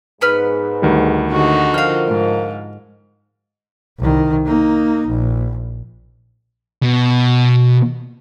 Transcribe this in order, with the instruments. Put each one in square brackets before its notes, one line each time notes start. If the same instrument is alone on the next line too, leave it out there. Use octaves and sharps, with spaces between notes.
[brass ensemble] G#2 [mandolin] B3 B4 F6
[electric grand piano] D2 D#3 G3
[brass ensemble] D#2 G#2 A3 [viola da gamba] D3 D#4 F#4
[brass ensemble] F3 A#4 [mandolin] F5 G5 [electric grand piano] F6
[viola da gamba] G#2
[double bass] C2 D#3
A#3 D#4
A#1
[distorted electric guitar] B2